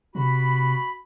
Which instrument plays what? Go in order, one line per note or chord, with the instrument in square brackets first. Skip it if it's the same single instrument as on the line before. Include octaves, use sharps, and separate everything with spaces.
[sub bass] C3 [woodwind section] F#4 B5